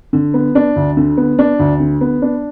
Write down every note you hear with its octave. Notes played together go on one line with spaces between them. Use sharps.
D3
B3
D4
D2
D3
B3
D4
D2
D3
B3
D4